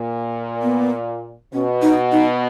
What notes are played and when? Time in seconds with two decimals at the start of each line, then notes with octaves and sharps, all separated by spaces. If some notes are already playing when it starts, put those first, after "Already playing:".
Already playing: A#2
0.62 B3
1.53 B2 C#4
1.82 D#4
2.12 D#4